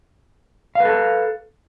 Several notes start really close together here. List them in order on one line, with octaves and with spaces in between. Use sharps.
F5 B4 A4